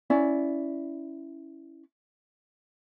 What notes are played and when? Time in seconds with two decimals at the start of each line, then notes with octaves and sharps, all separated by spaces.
0.10 C#4 E4 D5